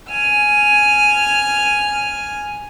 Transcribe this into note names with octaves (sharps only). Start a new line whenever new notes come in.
G#5 F6